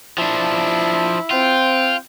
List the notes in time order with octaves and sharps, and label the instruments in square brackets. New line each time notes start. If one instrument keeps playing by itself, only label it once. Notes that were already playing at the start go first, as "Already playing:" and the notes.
[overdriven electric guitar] F3 D4 [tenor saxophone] E4
[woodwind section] C4 G5 [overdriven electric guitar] F4